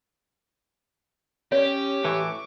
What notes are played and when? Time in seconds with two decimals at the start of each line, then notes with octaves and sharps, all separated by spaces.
1.52 C#4 G4 C#5
2.04 A2 E3 C#6 D6